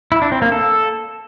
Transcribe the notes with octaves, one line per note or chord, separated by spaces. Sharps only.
E4
D4
C4
A#3
A4